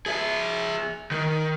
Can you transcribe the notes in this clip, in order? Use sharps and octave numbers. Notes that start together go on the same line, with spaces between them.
G#4 E5
D#3